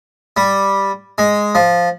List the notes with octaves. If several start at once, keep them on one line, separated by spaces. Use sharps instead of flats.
G3
G#3
F3